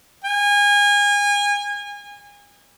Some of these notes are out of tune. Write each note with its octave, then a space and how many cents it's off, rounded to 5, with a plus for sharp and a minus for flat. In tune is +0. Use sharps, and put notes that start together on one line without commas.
G#5 -30